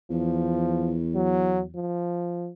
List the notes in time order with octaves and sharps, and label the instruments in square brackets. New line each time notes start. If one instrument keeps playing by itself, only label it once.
[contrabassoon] E2 [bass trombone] F3
[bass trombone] F#3
F3